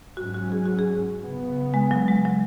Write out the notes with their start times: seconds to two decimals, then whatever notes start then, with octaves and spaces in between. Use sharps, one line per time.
0.17 G#2 F#3 C#4 F#4
0.34 F#4
0.52 G#4
0.65 F#4
0.79 G#4
1.21 C#3 B3
1.74 G#3
1.91 F#3
2.08 G#3
2.25 F#3